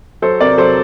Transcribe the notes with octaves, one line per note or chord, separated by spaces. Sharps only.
F#3 A4 C5
C3 A#4 D5
F#3 A4 C5